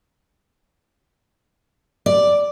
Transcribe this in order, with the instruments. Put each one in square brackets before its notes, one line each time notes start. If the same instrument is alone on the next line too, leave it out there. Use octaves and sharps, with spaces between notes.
[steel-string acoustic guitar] D5